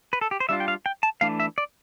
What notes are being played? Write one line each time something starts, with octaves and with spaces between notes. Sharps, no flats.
B4
A4
G4
C5
G3 D4 F4 E5
G5
F5
G5
A5
E3 A3 D4 F5
E5
D5